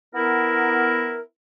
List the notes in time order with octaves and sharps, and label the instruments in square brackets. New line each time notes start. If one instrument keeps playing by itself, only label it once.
[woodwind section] B3 E4 A#4